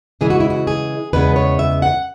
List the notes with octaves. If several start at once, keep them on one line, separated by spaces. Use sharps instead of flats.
C#3 E3 G#3 G#4
F#4
E4
F#4
G#4
E2 C#3 G#3 B3 B4
C#5
E5
F#5